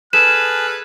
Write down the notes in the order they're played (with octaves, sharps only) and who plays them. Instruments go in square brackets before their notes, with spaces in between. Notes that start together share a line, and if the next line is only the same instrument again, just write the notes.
[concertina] G#4 A4 [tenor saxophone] B4 [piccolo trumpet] F6 [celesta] E7